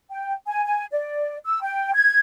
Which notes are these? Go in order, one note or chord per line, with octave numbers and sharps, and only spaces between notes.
G5
G#5
G#5
D5
E6
G5
G#6